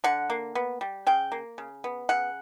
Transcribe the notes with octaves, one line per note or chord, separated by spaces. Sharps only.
D3 F#5
A#3
B3
G3
C#3 G5
A#3
C#3
B3
C#3 F#5